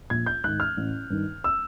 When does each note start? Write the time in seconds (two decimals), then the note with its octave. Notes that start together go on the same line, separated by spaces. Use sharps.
0.10 A#1 G#6
0.26 G6
0.44 G#2 D#3 F#6
0.60 F6
0.77 A1
1.10 G2 D#3
1.44 E6